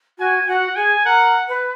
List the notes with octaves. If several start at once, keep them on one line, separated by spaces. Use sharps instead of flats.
F#4 G#5
F#4 F#5
G#4 G#5
A#4 F#5
B4